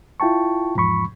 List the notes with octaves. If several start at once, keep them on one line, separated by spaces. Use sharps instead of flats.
E4 F4 G5 A5 C#6
E2 G#2 F3 B5 C#6